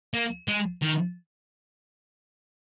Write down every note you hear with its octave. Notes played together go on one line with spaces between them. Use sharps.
A#3
G#3
D#3